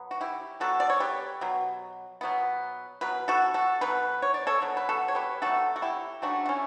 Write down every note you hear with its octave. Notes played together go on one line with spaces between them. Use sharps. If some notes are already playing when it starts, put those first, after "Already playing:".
Already playing: B2 F#3 B3
F#4
E4 G4
B2 F#3 B3 F#4 A4
D5
C#5
G4 B4
B2 F#3
B2 F#3 B3
B2 F#3 B4
F#4 A4
F#4 A4
B2 F#3 B4
C#5
D5
A4 C#5
B2 F#3
B4
F#4 A4
C#5
G4 B4
B2 F#3 A3 F#4 A4
F#4
E4 G4
C#3 F#3 A3 D4 F#4
F#4
C#4 E4